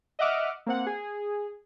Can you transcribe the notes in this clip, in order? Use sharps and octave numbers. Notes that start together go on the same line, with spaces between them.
D#5 E5 F#5 D6 F6
A#3 C4 F#5
G#4